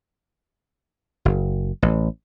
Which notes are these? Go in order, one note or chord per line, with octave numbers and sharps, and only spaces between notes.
F#1
A1